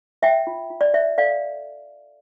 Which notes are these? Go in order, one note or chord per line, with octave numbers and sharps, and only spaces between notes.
C5 E5 G5
F4
F4
D5
C5 E5
A4 D5 F5